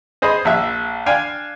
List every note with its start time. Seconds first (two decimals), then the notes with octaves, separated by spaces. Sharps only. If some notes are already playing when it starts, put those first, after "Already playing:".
0.22 G#4 C5 D#5 B5
0.45 A#1 E5
1.06 D4 F5 G5 G#5